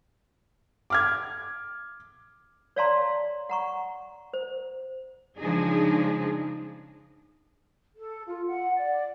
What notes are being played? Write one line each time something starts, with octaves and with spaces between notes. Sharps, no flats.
D6 F6 G#6
C#5 D5 F5 A5 A#5 C6
F#5 A#5 C#6
C5
C#3 F3 G#3 D4 D#4 G#4
A4
F4
F#5
D5